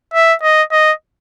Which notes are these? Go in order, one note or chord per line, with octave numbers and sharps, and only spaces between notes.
E5
D#5
D#5